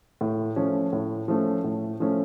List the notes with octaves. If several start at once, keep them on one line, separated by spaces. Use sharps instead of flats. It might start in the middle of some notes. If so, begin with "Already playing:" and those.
A2
F3 A3 C#4
A2
F3 A3 C#4
A2
F3 A3 C#4